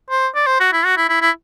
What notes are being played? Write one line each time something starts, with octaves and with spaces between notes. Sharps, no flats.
C5
D5
C5
F#4
E4
F#4
E4
E4
E4